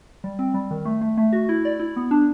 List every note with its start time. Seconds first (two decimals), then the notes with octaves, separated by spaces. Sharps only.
0.24 G3
0.39 C4
0.54 G3
0.71 D#3
0.85 A3
1.01 A3
1.17 A3
1.33 F#4
1.49 E4
1.65 D5
1.80 E4
1.96 B3
2.11 D4